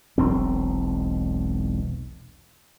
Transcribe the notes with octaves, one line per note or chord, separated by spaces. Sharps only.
E1 B1 C4